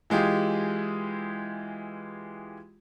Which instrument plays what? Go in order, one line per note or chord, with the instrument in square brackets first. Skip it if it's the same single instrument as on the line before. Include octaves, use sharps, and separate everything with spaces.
[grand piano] E3 G#3 F4 G4 G#4